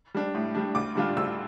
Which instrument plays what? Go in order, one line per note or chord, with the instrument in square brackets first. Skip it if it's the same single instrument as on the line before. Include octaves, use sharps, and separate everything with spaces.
[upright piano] G3 D4
A2
G3 D4
D2 D6
D3 G3 D4 F4
D2 E6